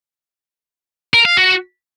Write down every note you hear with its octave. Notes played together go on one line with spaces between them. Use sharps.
A#4
F5
F#4